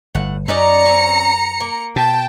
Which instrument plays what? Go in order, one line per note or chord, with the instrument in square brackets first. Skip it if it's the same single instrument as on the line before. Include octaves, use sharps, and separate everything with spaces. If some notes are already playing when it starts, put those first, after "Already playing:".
[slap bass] G1 [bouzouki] A2 F#5
[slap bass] F#2 [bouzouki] C#4 D#4 D5 [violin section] A#5 C#7
[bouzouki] C4 C#4
A#3
[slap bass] B2 [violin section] G5 A5